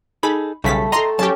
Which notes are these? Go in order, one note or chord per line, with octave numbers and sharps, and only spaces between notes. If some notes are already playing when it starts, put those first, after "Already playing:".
D#4 G#4 A4 B5
B1 C#3 G3 A3 A4 B6
A4 D#5 G5 A#5 C6 A#6
F#3 C#4 G4 G5 A5 C#6